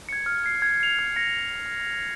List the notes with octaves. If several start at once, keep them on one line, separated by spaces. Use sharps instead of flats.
G#6 C#7
F6
G#6 C7
G#6
C7 F7
F6
A#6 C#7